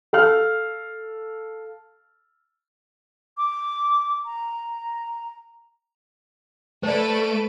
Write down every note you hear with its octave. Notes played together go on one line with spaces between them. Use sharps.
A4 F5 F6
D6
A#5
A3 A4 B4 C5 D5 D7